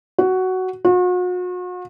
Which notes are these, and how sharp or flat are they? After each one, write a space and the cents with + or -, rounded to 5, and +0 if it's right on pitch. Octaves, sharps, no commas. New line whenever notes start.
F#4 +10
F#4 -40